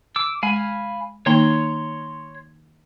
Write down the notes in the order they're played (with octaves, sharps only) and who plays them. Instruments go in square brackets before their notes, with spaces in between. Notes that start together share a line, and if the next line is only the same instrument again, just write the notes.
[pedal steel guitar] D6 E6
[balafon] G#3 [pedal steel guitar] F5 G#5 B5
[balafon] D#3 A#3 D#4 [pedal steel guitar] C#5 A#5 C6